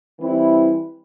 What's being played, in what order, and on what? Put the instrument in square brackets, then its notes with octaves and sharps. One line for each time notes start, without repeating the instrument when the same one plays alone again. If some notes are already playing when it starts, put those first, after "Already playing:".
[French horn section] E3 G3 C4 E4